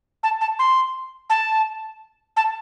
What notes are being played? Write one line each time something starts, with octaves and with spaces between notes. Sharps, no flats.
A5
A5
C6
A5
A5